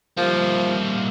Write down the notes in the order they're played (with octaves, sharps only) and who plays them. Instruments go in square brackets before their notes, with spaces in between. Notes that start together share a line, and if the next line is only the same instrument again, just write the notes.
[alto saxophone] F3 [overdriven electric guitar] G3 A#3